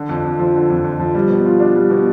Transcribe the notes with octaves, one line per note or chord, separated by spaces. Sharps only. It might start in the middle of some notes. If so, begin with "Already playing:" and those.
Already playing: D3
F2
F2
F3
D3
F2
F2
F3
G3
B2
F4
D4
G3
B2